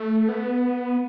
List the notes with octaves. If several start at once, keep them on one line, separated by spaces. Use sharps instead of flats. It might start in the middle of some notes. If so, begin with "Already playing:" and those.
Already playing: A3
B3